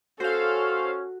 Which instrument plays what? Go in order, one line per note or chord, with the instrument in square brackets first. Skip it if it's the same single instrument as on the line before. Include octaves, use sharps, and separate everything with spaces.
[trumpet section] C#4 [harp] F#4 [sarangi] A4 [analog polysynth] C5 F5